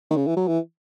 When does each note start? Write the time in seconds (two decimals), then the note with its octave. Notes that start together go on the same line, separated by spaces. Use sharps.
0.11 D#3
0.17 C#3
0.27 E3
0.37 F#3
0.48 E3